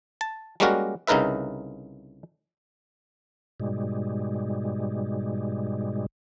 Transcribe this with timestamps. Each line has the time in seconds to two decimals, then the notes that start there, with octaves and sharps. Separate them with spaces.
0.21 A5
0.60 G3 G#3 A#3 C#4 F#4 A#4
1.07 C2 C#3 D#4 A#4 B4 E5
3.60 G#2 B2 G3 G#3